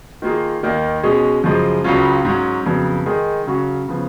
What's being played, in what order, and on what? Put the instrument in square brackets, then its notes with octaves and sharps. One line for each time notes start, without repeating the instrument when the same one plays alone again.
[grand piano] D#3 A#3 F4 G#4
D#2 D#3 A#3 D#4
B2 G#3 C#4 G#4
F#2 C#3 F3 G#3
C#2 C#3 F#3 C#4 F4
G#2 F#3 C#4
F2 C#3 F#3 B3
D#3 G#3 D#4 G#4
C#3 F#3 C#4 F#4
C#3 F3 B3